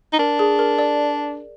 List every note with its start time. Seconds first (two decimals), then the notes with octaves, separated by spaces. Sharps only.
0.13 D#4
0.19 D4 A#4
0.39 G#4
0.59 A#4
0.79 D5